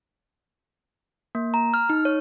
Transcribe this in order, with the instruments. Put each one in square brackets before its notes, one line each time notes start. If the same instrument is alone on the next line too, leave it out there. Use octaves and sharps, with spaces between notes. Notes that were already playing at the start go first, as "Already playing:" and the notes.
[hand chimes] A#3
A#5
F6
D#4
C#5